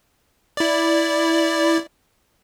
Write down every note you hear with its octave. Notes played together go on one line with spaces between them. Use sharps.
E4 D5